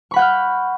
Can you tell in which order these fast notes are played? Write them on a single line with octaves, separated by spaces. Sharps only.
C#6 B5 F#5 G6 F6